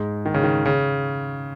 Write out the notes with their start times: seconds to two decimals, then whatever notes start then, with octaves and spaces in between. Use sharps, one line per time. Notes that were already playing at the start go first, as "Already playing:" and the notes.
Already playing: G#2 G#3
0.26 D#3
0.34 C#3
0.44 D#3
0.66 C#3